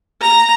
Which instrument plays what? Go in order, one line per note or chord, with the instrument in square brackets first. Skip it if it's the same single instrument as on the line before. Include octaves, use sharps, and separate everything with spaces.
[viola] A#5